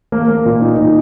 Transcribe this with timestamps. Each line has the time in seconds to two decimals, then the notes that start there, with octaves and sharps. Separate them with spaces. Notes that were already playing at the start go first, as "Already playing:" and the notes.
0.12 A#3
0.28 A#3
0.45 A#2
0.61 D#4
0.78 A#2